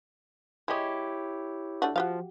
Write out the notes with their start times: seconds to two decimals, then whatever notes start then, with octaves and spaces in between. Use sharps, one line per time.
0.68 G#3 E4 G4 C#5 D#5
1.82 A3 D4 F#4
1.96 F3 F#4 G4 F5